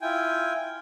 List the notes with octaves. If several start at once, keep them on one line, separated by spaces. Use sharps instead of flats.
E4 F4 G5 G#5